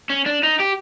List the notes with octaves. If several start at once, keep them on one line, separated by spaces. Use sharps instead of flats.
C#4
D4
D#4
G4